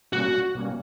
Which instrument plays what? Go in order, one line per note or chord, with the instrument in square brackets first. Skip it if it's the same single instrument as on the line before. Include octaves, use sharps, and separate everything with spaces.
[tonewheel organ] B2 G3 A#3 C#4 [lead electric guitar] F#4
[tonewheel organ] B2 G3 A#3 C#4